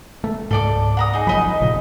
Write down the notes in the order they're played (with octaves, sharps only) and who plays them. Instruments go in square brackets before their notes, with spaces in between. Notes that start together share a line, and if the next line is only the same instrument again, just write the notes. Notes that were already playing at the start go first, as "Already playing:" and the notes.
[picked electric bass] A3
[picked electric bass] C#2 G#2 [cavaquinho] A4 D5 D6
[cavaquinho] F#5 A#5 D#6
D#4 G#4
[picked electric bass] G#1 F3 F#3 [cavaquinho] D#4 D#5 B5
[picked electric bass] F1 A#2 C#3